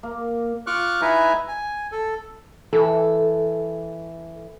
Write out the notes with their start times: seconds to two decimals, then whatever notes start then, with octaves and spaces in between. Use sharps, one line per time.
0.03 A#3
0.67 F4 C#6 D6 F6 F#6
1.01 D#4 E4 B4 E5 G#5 A#5
1.48 G#5
1.92 A4
2.73 E3 A4